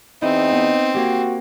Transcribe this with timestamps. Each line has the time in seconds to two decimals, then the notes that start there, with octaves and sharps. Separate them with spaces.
0.22 E2 C4 D#4 E4
0.53 B3
0.95 A#3 F#4 G4